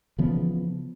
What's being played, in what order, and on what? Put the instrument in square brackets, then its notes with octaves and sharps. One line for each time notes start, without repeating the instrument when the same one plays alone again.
[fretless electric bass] C#3 E3 F3 B3